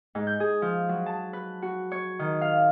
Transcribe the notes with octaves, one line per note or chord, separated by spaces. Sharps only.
G#2
G6
G#4
F3
F#3
A5
B4
F#4
C#5
D#3
F5